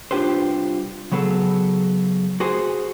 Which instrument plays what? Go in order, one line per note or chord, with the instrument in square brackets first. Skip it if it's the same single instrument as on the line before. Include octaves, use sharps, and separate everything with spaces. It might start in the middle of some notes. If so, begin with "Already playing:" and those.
[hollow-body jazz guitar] C2 D4 F4 G4 B4 C5
C#3 F#3 B3 G#4 A4
F#4 G#4 C5